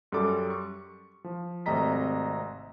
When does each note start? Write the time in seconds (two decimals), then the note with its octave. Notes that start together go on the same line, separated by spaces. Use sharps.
0.12 F#2 G3 A4 D6
0.50 C#6
1.24 F3
1.66 G#1 C3 A3 D#5 A#5 B6